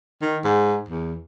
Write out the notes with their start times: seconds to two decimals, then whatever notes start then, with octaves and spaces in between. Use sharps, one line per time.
0.22 D#3
0.44 G#2
0.89 E2